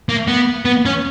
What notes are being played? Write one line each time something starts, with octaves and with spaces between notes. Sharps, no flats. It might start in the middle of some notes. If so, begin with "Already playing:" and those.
A#3
B3
B3
C#4